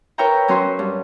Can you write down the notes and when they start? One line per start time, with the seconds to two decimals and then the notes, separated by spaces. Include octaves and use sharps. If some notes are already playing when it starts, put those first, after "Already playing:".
0.18 A#4 B4 C#5 E5 G5 A#5
0.48 F#3 C#4 F#4 C6
0.79 G2